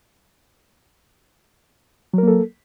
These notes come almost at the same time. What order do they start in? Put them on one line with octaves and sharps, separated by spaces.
F#3 A#4 A#3 A4